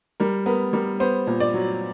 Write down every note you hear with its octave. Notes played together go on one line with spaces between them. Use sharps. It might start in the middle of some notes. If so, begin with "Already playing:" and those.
G3 A#4
B3 A#4
G3 A#4
B3 C5
A#2
D5
F#3